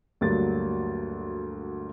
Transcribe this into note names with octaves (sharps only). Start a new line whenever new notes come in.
D2 G2 F#3 A#3 A6